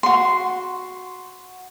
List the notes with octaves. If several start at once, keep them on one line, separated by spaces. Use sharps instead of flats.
F#4 C6